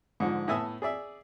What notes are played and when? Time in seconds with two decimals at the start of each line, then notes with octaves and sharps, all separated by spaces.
0.20 G#2 D3 F3
0.48 A2 B3 E5 G#5 A5 D#6
0.82 G#4 D5 E5